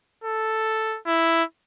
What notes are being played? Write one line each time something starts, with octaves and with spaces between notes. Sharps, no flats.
A4
E4